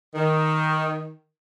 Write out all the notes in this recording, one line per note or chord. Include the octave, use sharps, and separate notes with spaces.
D#3